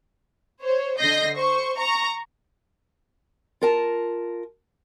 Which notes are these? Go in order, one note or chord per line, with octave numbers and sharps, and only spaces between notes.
C5 C#5
D3 D#5 G6 A#6 C7
C5 C#6
A#5 C#6
F4 A#4 A5